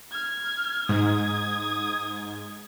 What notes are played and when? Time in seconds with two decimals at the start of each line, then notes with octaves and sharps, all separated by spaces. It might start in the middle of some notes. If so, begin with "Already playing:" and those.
0.12 F6 G#6
0.89 G#2 D#6 G#6